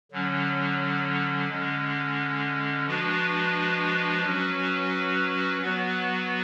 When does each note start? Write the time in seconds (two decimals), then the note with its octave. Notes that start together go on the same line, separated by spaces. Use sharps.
0.12 D3 F#3 C#4
1.49 D3 G#3 C#4
2.86 F3 G#3 D4 F#4 B4
4.24 F#3 C#4 F#4 B4
5.61 F#3 B3 F#4 B4